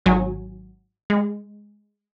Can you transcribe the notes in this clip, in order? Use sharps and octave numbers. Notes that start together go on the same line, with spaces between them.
G#1 F#3 G#5
G#3